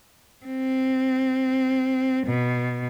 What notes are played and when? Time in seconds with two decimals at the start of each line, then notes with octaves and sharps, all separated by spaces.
0.45 C4
2.26 B2